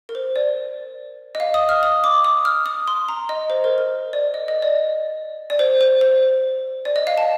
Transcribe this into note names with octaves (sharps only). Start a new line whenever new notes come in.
A#4
C5
D5
D#5
F5
D#6
F6
D#6
D6
D#6
F6
D#6
C6
A#5
D#5
C5
A#4
A#4
D5
D#5
D#5
D5
D5
C5
C5
C5
D5
D#5
F5
A5